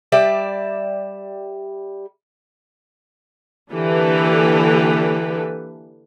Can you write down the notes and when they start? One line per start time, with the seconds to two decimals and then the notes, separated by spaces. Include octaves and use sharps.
0.12 G3 D5 E5
3.72 D3 E3 A#3 G4 A4 B4